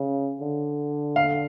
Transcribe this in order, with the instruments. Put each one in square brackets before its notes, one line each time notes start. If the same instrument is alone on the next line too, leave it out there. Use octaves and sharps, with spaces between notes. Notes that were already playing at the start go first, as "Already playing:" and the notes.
Already playing: [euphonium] C#3
D3
[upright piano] F5